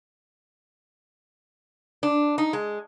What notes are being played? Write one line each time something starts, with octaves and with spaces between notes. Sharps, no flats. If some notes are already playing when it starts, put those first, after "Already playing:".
D4
D#4
G#3